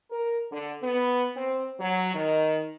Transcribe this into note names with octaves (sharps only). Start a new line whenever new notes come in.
A#4
D3
B3
C4
F#3
D#3